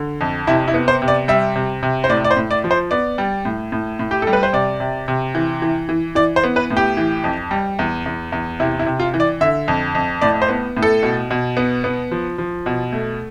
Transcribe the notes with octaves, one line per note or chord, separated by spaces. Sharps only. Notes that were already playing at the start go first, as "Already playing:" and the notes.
Already playing: D3
F2
C3 E4
E4
B3
C5
C3
D5
G3 E5
C3
C3
C5
A2 D5
D5
C5
A2
D5
F3
C5
B3 D5
G3
A2
A2
A2
G4
G3 A4
B4
C5
C3 D5
C3
C3
E3
E3
E3
E3 D5
C5
B3
B4
A2
G4
E3
F2
G3
E2
E2
E2
C3 E4
E4
C3
F4
E3
D5
D3 E5
F2
F2
A2 D5
C5
B3
A2
A4
B2
B2
B3
B3
F3
F3
B2
A3